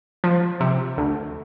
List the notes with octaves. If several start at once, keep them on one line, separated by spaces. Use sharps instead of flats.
F3
C3
D2